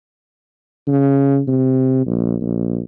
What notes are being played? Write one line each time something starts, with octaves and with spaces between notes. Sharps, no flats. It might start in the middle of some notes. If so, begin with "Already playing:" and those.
C#3
C3
A#1
A#1